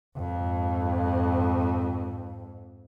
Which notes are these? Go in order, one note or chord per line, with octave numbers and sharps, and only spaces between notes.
F2 G#2